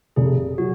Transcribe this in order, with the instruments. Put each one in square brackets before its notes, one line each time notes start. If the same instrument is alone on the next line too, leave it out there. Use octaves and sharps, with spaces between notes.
[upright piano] F1 [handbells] G#4
[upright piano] F#3 [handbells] F#4